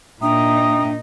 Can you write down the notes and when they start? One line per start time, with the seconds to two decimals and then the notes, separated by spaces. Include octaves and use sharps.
0.22 A#2 D4 D#4 E5 G5 A#5 D#6